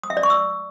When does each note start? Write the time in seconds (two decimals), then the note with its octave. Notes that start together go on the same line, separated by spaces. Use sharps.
0.03 D#6
0.10 E5
0.17 D5
0.23 C#6
0.30 E6